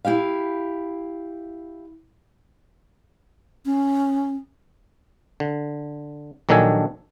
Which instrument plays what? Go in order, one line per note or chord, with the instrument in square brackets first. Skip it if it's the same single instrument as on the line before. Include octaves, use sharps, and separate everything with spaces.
[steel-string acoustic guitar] E4 G4 E5 F5
[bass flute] C#4
[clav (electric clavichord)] D3
A#1 D#3 F#3 D4 A4 G#5